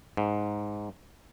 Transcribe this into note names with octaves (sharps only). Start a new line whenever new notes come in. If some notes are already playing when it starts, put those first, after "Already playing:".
G#2